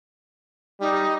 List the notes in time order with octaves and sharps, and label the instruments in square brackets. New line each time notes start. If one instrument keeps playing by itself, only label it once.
[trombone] G3 [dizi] D#4